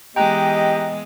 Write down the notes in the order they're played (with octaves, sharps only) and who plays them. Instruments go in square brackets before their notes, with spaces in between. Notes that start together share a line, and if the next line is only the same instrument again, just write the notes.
[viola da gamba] E3 G#3 B3 [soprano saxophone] G4 [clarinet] D#5 [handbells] G5 A#5 F#6